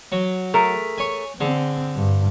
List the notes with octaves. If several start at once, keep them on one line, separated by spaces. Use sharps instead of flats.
F#3
A3 G#4 A#4
C#5 G#5
D3 C4 G#4
G2